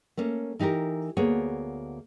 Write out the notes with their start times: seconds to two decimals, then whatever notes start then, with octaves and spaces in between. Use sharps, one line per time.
0.17 A3 A#3 C#4
0.59 E3 D#4 G4 A4 A#4
1.17 D2 A#3 B3 G#4 C#5